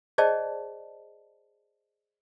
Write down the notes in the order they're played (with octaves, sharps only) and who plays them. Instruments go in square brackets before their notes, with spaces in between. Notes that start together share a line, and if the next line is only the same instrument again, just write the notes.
[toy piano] G#4 C5 D5 D#5 G5 A5